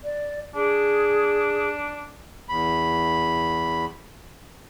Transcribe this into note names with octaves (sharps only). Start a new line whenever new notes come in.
D5
D4 G#4
E2 B5